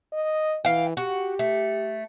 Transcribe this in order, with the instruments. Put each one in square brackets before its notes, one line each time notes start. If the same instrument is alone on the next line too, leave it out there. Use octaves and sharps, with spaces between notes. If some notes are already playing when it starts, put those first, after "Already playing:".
[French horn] D#5
[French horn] E3 [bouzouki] F5 G5
[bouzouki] F#4 [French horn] G4
[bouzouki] A3